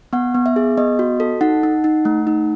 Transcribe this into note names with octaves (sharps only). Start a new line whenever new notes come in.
B3 F#5
B3
E5
G#4
B3 D#5
F#4
A4
D#4 F#5
D#4
D#4
A3
D#4